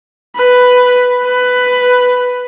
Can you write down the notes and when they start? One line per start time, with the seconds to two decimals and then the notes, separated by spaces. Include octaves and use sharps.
0.37 B4
1.25 B4